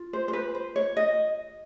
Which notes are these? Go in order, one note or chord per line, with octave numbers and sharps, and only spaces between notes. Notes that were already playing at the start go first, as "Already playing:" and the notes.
Already playing: F4
C5
C5
B4
C5
C#5
D#5